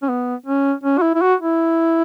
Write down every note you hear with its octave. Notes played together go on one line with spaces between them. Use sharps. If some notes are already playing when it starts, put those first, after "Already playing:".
C#4
B3
C#4
C#4
F#4
E4
E4
F#4
E4